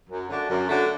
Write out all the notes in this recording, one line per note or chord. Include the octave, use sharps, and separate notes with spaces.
F#2
D3 A3 D4 F#4
F#2
D3 A3 D4 F#4